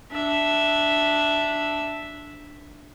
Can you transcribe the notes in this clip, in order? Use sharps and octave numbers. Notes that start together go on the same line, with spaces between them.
D4 E5